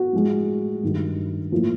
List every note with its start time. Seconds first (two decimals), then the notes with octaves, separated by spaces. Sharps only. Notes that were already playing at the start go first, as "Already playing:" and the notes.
Already playing: F#4
0.13 A2 F3 G#3
0.83 G2 D#3 F#3
1.52 A2 F3 A#3